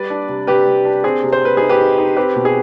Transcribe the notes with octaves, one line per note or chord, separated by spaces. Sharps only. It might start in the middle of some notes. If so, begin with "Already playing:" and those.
Already playing: G3 B4 D5
D4
C3
C3 G4 B4
C3
D4
C4 G#4
C3
C5
C4 B4
D#4 G#4
G4 B4
D#4
D#4
C4 G4 B4
B2
G#4